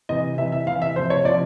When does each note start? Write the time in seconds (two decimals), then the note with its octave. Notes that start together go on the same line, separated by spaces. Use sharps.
0.09 C3 E3 D#5
0.38 C3 E3 E5
0.52 E5
0.66 C3 F5
0.70 E3
0.82 E5
0.95 F3 C5
0.99 C3
1.10 C#5
1.25 C3 F3 D5